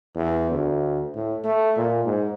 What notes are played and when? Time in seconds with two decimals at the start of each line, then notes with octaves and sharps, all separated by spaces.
0.15 E2
0.51 D2
1.15 A2
1.44 A3
1.76 A#2
2.05 G#2